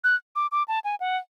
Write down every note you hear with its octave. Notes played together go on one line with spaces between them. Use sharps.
F#6
D6
D6
A5
G#5
F#5